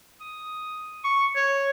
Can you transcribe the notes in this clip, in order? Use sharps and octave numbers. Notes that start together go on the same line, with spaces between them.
D#6
C#6
C#5